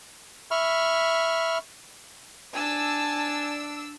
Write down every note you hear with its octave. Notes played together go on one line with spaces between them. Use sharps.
E5 B5 C#6 F6
D4 G#5 A5 E6